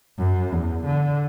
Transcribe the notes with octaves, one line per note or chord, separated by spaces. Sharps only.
F#2
E2
D3